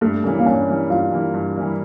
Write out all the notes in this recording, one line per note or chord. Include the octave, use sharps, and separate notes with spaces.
G2 A3
E3 G3 A#3 C#4
A#3
G2 C#4
E3 G3 A#3
G2 F4
E3 G3 A#3
G2
E3 G3 A#3